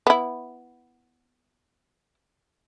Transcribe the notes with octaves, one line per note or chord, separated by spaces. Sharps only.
B3 E4